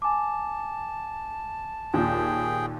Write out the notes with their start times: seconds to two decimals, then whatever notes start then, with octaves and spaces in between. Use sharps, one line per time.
0.02 G#5 A5 D6
1.94 D#2 A#2 G#4 G5